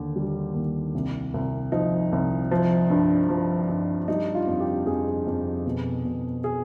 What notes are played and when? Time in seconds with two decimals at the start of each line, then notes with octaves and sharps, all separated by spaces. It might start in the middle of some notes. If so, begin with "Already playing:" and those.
Already playing: D#2 D3
0.16 G3
0.54 D#2
0.95 C2
1.34 C2
1.72 F3 D#4
2.12 C2
2.51 F3
2.90 G2
3.29 F3
3.69 G2
4.08 G3 D#4
4.35 F4
4.47 F2
4.60 G4
4.86 F2 G#4
5.27 F2
5.66 B2
6.05 B2
6.44 G#4